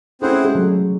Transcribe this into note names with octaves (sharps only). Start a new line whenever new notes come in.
A3 C4 C#4 E4 G#4 C5 F#5
G#3
F#3 A3